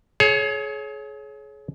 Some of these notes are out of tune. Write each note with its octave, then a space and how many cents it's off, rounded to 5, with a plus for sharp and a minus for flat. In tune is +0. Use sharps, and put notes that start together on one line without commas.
G#4 +35 C#5 +0